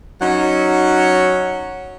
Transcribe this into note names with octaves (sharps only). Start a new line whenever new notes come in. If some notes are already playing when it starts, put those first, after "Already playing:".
F#3 C#4 D#4 F#5